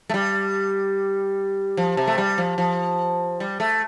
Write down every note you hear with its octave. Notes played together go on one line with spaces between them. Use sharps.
A3
G3
F3
C3
A3
G3
F3
F3
G3
A3